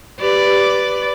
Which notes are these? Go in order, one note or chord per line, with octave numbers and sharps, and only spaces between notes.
G4 B4 D5